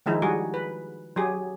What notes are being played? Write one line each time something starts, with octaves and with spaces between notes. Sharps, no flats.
D#3 F3 G#3 D#4 E4
G3 F#4 G#4
B4
F#3 G4 G#4